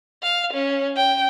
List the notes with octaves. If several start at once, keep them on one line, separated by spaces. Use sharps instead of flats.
F5
C#4
G5